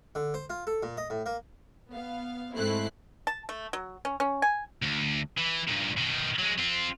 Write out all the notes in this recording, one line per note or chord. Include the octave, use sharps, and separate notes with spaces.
D3
C5
F4
A4
A#2
D#5
A2
A#3
B3 F5
G#2 A3 C4 E4 F#6 C7
A5
A3
F#3
C#4
C#4
G#5
D2
E3
G2 A#2
B2 D#3
F#3 G#3
C4 F4